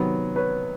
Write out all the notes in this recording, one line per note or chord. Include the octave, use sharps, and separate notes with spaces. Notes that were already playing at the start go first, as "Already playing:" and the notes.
Already playing: C3 D#3 F#3 B3
B4 C#5